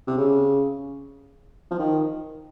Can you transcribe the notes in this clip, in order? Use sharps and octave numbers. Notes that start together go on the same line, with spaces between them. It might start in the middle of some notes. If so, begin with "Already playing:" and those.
C3
C#3
F3
D#3